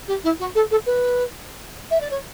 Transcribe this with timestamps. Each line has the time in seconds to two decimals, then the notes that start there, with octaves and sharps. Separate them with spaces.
0.08 G4
0.24 E4
0.40 F#4
0.55 A4
0.71 A4
0.86 B4
1.91 E5
2.01 D5
2.11 C#5